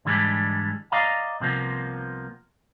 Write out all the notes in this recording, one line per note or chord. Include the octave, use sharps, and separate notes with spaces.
G#2 D3 E3 G3 G#3 D4
D5 D#5 F5 A#5
C2 C3 F3 A#3 B3